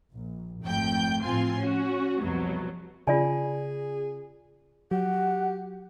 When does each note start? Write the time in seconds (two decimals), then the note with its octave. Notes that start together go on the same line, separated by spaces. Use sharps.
0.13 A#1
0.63 G#1 F2 A3 G5 G6
1.22 A2 F3 C4 F4 G#5 C6
1.59 C#4 F#4
2.21 C2 F2 B2 F#3
3.07 C#3 F4 G#4 D5 G#5
4.91 F#3 G4 F#5